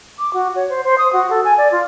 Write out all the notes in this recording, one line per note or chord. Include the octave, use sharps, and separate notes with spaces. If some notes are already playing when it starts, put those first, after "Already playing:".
D6
F#4
C#5
C5
C5
D#6
F#4
A4
G#5
D5
F4